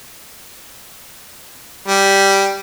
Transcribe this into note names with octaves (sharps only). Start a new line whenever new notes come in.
G3